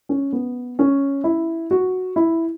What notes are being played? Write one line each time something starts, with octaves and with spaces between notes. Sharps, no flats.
C#4
B3
C#4
E4
F#4
E4